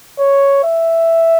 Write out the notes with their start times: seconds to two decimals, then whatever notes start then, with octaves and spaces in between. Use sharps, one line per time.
0.19 C#5
0.63 E5